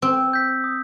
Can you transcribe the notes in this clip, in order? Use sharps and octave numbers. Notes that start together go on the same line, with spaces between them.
C4 E6
G6 B6
D#6